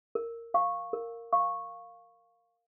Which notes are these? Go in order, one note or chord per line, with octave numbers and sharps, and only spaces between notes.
A#4
F5 C#6
A#4
F5 C#6